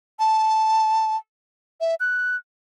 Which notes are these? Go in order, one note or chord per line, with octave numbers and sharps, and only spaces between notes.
A5
E5
F#6